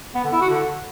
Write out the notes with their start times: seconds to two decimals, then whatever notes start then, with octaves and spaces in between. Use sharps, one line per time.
0.15 B3
0.24 D3
0.32 E4
0.41 F#4
0.50 D3